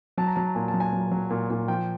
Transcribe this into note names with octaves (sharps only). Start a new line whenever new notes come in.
F#3 A5
A#5
F#3 A5
A#2 G#5
A5
F#3
G#5
F#3
F#3
A#2
A#2
F3 G5